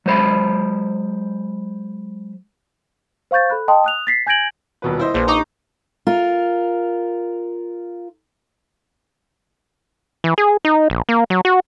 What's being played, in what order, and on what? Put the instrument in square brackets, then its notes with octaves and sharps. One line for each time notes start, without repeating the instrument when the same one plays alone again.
[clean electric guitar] F#3 G#3 C5 B5
[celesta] C5 F5 C#6 G6 A6
A4 B5 F#6
D#5 G5 A5 C6 D#6
D#6 F#6 F7
A6 B6 C7
G#5 G6 G#6 A#6 D7 F#7
[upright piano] D#1 B2 B4
E4 C5 D#5
[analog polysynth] A#1 [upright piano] B4 C5
[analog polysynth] D#4 [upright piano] A#5 C#6 D6
[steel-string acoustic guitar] F4 A#4
[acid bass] E3
G#4
D#4
A#1
A#3
F#3
F#4